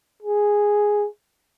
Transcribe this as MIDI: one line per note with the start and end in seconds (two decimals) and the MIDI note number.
0.22 1.07 68